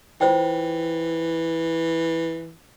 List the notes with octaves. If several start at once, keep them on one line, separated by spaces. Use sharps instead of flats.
E3 F4 C5 G5